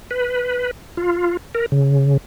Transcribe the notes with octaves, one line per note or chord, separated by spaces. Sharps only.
B4
F4
A#4
C#3